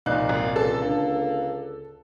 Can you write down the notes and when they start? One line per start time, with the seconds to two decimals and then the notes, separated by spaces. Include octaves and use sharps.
0.06 C2 F2 A#2 D#4 F5 F#6
0.29 G#1 D#3
0.56 C#2 A4 A5
0.82 D3 A#3